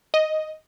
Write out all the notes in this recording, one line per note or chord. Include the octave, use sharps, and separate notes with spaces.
D#5